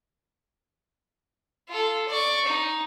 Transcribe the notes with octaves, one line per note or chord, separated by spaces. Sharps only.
F4 A4
D5 C#6
D#4